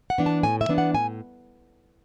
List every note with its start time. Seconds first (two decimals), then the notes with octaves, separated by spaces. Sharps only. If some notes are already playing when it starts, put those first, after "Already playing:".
0.10 F#5
0.18 E3 B3 D4
0.26 A5
0.43 A2 G#5
0.61 E5
0.69 E3 B3 D4
0.78 F#5
0.94 A2 G#5